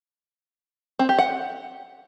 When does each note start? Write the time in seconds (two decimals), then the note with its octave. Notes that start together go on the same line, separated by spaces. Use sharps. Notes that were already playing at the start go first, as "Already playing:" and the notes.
0.99 C4
1.09 G4
1.19 F#5